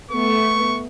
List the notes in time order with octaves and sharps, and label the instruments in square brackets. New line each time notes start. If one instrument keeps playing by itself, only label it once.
[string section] A3 B3 [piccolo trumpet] C#6